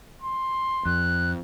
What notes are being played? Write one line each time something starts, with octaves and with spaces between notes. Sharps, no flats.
C6
F2 F#6